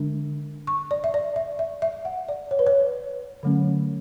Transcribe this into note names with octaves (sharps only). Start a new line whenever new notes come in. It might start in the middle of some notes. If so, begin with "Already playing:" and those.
Already playing: D3 G#3 D4
C#6
D5
E5
D5
E5
E5
E5
F#5
D5
C#5
B4
C#5
D3 F#3 A3 C#4